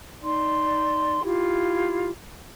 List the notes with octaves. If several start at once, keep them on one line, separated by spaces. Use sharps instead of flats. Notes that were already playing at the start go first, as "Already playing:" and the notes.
D#4 D5 C6
E4 F4 G4